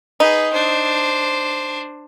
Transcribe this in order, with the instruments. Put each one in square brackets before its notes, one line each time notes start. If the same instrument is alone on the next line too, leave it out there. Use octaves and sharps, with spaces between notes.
[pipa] D#4 [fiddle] G#4 B4
[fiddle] D4 C5